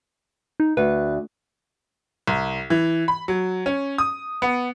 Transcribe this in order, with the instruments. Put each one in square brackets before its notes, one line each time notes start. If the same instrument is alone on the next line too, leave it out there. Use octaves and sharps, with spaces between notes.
[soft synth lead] D#4
[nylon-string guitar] D2 [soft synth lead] B4
[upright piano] C2
E3
B5
F#3
C#4
D#6
B3